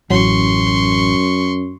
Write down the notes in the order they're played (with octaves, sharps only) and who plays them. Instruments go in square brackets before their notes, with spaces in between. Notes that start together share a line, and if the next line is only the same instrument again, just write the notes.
[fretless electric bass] A1 [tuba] F#2 [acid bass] F#3 [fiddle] C6 C#6